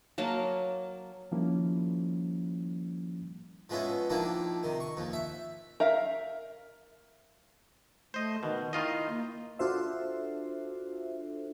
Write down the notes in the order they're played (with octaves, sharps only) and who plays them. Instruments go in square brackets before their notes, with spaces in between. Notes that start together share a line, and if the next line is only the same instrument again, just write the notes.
[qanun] F#3 A#3 A5
[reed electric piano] D#3 F3 G3 A#3 C#4 E4
[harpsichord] F3 G#3 B3 C#4 E4
D#3 F3 A#3 D4 E4
C3 D#3
C#6
D#2 F3
E5
[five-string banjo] A#4 E5 F5
[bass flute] A3 [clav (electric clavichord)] C5 D#5
[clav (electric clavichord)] B2 [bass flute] D#3
[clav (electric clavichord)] D#3 F4 D#5 [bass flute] E4
[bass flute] A#3
[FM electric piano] D4 F4 F#4 A4 C5 E5